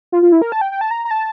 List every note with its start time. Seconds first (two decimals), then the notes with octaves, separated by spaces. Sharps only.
0.12 F4
0.22 F4
0.32 E4
0.42 A#4
0.52 A5
0.61 G5
0.72 G5
0.81 A5
0.91 A#5
1.05 A#5
1.11 A5